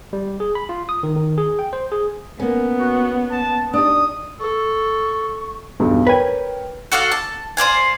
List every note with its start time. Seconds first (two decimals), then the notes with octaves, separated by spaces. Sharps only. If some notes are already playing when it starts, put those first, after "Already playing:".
0.13 G3
0.40 G#4
0.55 B5
0.69 F4
0.89 D#6
1.03 D#3
1.16 D#3
1.38 G#4
1.59 G5
1.73 C5
1.92 G#4
2.40 A#3 B3 C#4
2.80 F#4
3.31 A5
3.73 D4 D#4 G4 D#6
4.39 A4 C#6
5.80 B1 E2 G2
6.07 A#4 B4 C#5 G5 G#5
6.92 F#4 A4 D5 F5
7.12 A5
7.57 C5 D5 F5 G#5